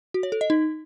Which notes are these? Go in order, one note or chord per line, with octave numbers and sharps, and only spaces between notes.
F#4
C#5
A4
D#5
D#4